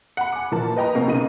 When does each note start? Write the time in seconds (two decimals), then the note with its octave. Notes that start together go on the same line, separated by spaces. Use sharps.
0.17 F#5 B5
0.32 G#5 D6
0.51 A#2 E3 F3 A#3 A5
0.76 B4 D#5 G5 A#5 B5
0.95 B2 A#3 C4
1.07 B1 C#3 D#4 D#7